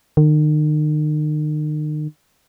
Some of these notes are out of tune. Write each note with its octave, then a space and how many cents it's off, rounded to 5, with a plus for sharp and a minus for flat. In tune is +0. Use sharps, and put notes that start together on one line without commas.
D#3 -40